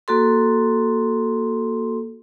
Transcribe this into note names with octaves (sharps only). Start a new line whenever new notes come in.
A#3 F#4 A4 C6